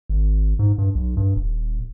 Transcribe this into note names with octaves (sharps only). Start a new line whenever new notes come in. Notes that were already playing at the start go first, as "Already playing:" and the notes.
G#1
G#2
G2
B1
G2
D#1